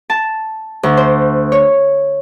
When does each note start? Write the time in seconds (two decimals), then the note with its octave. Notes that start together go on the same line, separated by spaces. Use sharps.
0.10 A5
0.83 D2
0.97 C5
1.52 C#5